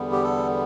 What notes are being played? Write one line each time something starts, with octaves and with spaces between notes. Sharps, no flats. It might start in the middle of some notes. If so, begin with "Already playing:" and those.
Already playing: E2 D3 G3 B3
G4
A4